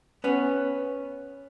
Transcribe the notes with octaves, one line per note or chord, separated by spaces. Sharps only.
B3 C#4